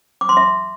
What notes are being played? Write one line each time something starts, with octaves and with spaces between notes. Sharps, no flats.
D6
C6
E5